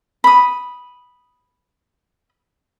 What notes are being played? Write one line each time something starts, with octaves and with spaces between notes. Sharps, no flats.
B5 D#6